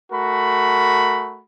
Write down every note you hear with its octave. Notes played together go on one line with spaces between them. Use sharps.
A3 F#4 A#4 B5